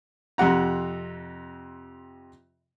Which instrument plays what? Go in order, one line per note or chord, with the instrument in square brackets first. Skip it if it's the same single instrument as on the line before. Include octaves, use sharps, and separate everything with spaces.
[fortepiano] F2 C3 F#5 A#5